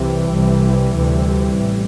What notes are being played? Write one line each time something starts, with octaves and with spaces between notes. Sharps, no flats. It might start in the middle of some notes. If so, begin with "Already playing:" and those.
Already playing: C2 C3 E3 G3
C2 C3
D2 C3
A1